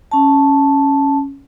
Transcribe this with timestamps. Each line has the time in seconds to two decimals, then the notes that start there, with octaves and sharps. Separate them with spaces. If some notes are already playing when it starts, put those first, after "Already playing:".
0.11 C#4 A5